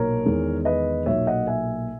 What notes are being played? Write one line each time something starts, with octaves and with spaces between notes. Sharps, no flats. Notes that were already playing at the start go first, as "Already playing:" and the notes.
Already playing: B1 A#2 A#4 C#5
E2 D#3 G#3
B4 D#5
B1 A#2 F#3 C#5 E5
D#5 F#5
E5 G#5